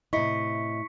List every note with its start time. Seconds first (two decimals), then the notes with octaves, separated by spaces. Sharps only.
0.13 A2 C3 E4 D#5 C#6 B6 C#7